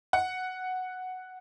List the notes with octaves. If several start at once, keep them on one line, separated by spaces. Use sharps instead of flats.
F#5